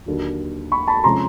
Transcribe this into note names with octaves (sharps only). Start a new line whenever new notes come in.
D#2 D3 F#3
B5 C#6
A5 B5
C3 F3 G#3 C#4 A#5 C6